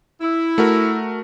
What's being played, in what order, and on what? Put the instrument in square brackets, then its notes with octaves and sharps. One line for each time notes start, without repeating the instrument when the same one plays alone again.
[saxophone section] E4
[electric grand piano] A3 F#4 A#4